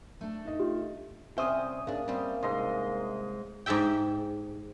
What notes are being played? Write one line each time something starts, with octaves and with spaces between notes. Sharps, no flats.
A3 D4 A4
D#4 D#5
F4 G4
C2 C4 C#4 C5 E5 D#6
G#2 A#3 D4
G3 C4
C2 G#2 D#5 C6
G#2 G4 G#4 E5 G5